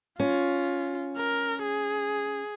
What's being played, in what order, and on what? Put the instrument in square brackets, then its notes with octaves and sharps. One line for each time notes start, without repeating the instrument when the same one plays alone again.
[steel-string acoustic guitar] C#4 [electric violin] F4
[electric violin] A#4
G#4